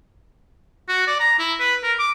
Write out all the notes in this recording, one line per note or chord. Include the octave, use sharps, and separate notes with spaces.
F#4
D5
A#5
E4
B4
A#4
D6